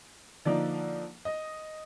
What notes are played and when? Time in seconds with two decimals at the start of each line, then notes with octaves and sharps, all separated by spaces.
0.45 D3 F3 A#3 D#4 D5
1.25 D#5